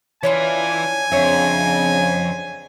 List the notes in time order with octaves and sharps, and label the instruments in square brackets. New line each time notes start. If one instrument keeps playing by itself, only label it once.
[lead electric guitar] E3 [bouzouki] C#4 D4 F4 [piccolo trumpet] G#5
[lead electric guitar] F2 [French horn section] C#3 C4 D4 [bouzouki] C#5 E5